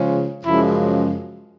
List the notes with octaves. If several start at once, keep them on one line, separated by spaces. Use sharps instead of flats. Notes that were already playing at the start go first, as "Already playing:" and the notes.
Already playing: C#3 F3 G#3 C#4
F#2 C#3 F3 G#3 E4